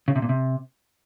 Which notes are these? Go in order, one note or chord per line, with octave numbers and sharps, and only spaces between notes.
C#3
C3
A#2
C3